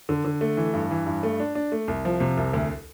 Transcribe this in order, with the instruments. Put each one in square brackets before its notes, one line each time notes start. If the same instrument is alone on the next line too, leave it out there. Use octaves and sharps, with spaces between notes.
[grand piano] D3
D3
A3
E3
G2
E3
G2
A3
D4
D4
A3
C2
F3
C3
C2
D2